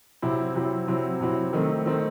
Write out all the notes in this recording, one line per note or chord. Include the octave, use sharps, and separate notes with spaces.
C3 F#3 C4 E4
C3 F#3 C4 E4
C3 F#3 C4 E4
C3 F#3 C4 E4
D#3 A3 C4
D#3 A3 C4